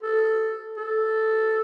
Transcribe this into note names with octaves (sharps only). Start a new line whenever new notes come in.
A4
A4